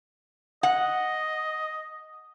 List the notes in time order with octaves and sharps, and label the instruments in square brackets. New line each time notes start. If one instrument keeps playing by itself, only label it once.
[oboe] D#5 [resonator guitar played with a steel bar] F#5